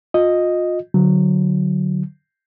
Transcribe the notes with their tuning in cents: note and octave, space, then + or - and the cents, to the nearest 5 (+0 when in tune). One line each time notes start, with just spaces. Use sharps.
F4 +35 D#5 +0
D3 +0 F#3 +0